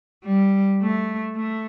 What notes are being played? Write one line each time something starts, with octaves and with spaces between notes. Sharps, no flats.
G3
A3
A3